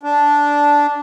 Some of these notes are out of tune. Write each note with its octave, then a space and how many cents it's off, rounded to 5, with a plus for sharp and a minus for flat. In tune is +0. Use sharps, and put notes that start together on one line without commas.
D4 -10